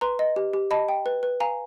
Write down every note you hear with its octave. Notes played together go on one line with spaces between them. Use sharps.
B4 A#5 C6
D#5
G4
G4
D#5 A5 B5
G5
B4
B4
F5 G#5 A#5